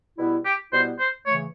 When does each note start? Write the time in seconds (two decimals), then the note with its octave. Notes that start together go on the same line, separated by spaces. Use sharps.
0.18 B2 G3 B3 E4
0.45 G4
0.72 B2 G3 B3 E4 C5
0.99 C5
1.26 C#3 E3 A3 C#5